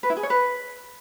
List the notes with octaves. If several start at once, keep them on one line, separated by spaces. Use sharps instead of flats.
B4
E4
G#4
C#5
B4